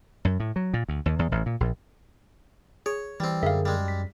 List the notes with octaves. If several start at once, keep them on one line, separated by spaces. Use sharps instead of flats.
F#2
A2
F#3
A#2
D2
D#2
E2
A1
A#2
A#1
G#4 C#5
E3 G3 C4
F#2 D3 G#4 A#4 E5 F5
G3 G#3
B6